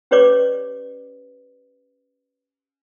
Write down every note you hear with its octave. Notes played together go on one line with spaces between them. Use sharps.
C#4 G4 B4 C#5 D5 D6